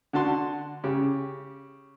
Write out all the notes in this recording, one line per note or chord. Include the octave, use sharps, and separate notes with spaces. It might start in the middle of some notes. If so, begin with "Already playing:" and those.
D3 F#4 A5 C6
C#3 G4